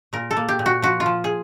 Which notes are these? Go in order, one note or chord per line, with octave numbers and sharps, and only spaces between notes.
A#2 A#4
A4
A#3
G4
A#2
F#4
F3 F#4
F4
F3
G#4